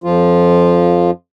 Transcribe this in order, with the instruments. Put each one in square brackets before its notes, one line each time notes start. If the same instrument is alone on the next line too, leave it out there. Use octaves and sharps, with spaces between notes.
[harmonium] F2 F3 F4